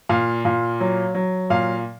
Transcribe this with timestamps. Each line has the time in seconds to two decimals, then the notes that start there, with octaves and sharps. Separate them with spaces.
0.09 A#2 F5
0.45 A#2
0.80 F#3
1.15 F#3
1.50 A#2 F5